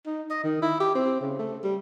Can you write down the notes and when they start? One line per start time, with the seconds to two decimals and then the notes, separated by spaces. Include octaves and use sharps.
0.06 D#4
0.30 D#5
0.44 D#3
0.62 E4
0.80 G4
0.95 C4
1.21 C#3
1.39 A3
1.64 G3